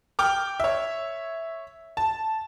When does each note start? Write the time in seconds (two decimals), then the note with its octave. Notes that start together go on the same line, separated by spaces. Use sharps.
0.19 G5 D6 F6
0.60 C#5 E5
1.97 A5